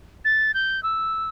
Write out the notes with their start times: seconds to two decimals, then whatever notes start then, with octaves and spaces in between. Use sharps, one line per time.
0.25 A6
0.54 G6
0.83 E6